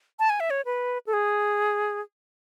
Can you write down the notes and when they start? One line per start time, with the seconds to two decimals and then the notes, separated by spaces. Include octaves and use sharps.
0.19 A5
0.30 G#5
0.40 E5
0.50 C#5
0.65 B4
1.07 A4
1.13 G#4